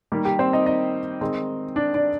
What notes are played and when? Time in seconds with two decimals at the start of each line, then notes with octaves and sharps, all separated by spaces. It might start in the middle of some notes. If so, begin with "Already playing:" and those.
0.12 D#3 G3 A#3 G4
0.25 G4
0.39 C4 C5
0.53 D#4 D#5
0.66 D#4 D#5
1.21 D#3 G#3 C4 D#4
1.76 D4 D5
1.94 D4 D5